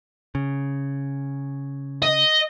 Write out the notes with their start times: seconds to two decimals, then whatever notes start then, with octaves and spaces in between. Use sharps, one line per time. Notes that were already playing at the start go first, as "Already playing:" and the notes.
0.35 C#3
2.03 D#5